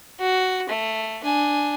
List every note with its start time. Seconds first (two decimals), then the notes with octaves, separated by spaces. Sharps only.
0.20 F#4
0.68 A3
1.23 D4 G#5